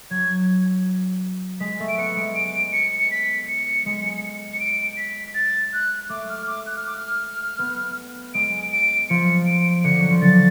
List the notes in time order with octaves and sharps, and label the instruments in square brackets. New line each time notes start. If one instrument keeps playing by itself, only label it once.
[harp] F#3 [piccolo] G#6
[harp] G#3 [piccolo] B6
[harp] A3
[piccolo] D7
[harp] B3 [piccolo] C#7
[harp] G#3
[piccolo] D7
C#7
C#7
B6
C#7
[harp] G#3
[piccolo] C#7
D7
B6
A6
F#6
[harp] A3 [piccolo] D6
[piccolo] F6
D6
F#6
F6
D6
F6
[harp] B3
[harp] G#3 [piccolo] D7
[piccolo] D7
[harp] F3 [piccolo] C#7
[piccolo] D7
[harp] D3 [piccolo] C#7
[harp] F#3
F3
[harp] D3 [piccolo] A6